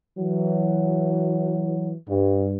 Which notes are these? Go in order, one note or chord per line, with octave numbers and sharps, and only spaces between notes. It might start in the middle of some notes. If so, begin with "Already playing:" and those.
E3 F#3
G2